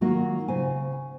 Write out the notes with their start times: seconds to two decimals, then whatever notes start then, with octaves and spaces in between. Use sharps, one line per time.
0.01 D#3 F#3 A#3 F4 F#4
0.48 C#3 C5 G#5